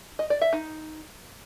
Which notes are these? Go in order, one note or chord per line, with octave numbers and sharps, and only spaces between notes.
D#5
D5
E5
D#4